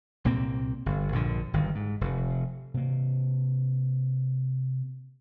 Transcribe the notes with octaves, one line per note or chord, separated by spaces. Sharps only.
C2 A#2 A#3 C4
G1
A#1 G2 D3
G1 D#3
G#2
F1
C3 A#3